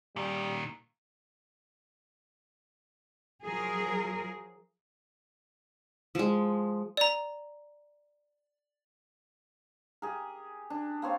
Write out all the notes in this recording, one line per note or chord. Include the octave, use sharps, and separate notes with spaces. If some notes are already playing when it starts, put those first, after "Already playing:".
A#2 D#3 G3
F3 F#3 G#4 A#4
F3 G#3
D5 A#5
G4 G#4 A#4
D4
A#3 C4 C#5 F5